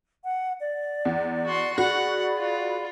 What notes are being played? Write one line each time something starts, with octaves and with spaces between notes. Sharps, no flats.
F#5
D5
E2
F#4 C6
F#4 G#4 D5 F#5 B5
F4